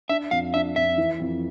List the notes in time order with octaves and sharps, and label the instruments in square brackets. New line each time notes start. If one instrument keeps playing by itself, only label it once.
[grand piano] D4 [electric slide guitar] E5
[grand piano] F2 [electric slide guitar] F5
[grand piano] D4 [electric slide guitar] E5
[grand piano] F2 [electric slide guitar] E5
[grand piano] E3
F2